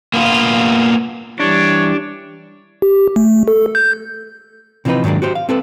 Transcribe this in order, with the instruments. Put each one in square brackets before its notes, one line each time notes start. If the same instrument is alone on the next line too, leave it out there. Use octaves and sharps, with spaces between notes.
[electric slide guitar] A#3 B3 F4
[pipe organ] E3 G3 [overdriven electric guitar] D4 [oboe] C#5
[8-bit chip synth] G4
A3
A4
G6
[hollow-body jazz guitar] C3 E3 F3 C4 D#4 B4
G#2 D#3 F#3 A#3 D4
F#4 G4 C5
F5
C4 A4 B4